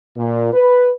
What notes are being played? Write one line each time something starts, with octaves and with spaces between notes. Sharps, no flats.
A#2
B4